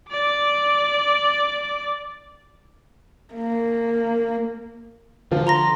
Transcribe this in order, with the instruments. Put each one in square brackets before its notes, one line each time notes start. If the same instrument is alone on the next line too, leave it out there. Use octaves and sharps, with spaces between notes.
[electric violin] D5 D6
[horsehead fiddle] A#3
[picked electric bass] D3 [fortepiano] F3
[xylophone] A#5 C6 A#6